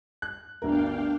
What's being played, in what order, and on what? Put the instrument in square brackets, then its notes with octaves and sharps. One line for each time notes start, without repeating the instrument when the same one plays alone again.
[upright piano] F#6
[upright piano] G1 D2 A#4 [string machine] D4 F5 G5